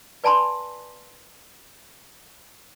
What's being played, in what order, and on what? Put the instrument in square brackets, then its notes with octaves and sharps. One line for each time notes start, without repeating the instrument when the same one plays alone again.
[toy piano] B4 D5 G#5 A5 B5 C6